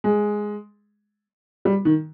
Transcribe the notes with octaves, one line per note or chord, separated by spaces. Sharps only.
G#3
G3
D#3